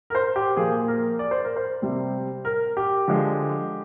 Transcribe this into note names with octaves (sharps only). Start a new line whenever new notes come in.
A#4
C5
G4
A#2 F3 A#3 F4 G#4
A#4
D5
C5
A#4
C5
C3 G3 C4
A#4
G4
D3 F3 G#3